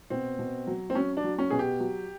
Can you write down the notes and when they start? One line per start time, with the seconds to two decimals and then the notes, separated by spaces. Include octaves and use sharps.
0.10 B2 C4
0.39 B2
0.67 F#3
0.90 C4
0.95 F#3 C#4
1.17 D4
1.24 F#3
1.39 C#4
1.50 B2 G#4
1.59 G4
1.80 F#3